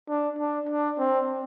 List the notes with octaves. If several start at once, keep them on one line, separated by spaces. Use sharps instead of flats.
D4
D4
D4
C4